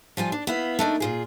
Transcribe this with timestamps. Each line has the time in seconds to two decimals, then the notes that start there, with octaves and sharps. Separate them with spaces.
0.17 F3 G3 F4 G#5
0.32 D4
0.47 B3 E4 F5
0.79 A3 D4 D#4 A#4
1.00 A#2 F4 G#4